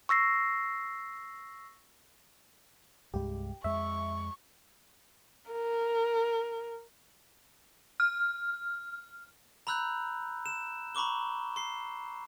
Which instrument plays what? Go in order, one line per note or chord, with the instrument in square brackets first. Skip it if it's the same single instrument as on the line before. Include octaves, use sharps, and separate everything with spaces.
[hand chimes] C#6 E6 A#6 C7
[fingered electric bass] C2 G2 G#3 [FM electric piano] G4
[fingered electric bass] F2 G#3 [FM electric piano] E5 [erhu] C#6
[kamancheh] A#4
[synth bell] F6
[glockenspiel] A#5 B5 E6 F#6 G6
E7
A#5 B5 C#6 D6 G7
C6 C7